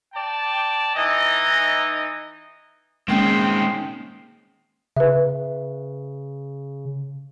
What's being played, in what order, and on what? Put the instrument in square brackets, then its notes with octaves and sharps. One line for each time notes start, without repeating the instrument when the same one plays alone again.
[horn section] D5 G5 A5
E3 D#4 D#5
[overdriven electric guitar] D#3 C4 [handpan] G#3 A#3 C#4 [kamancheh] G5
[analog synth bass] C#3 [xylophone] B4 E5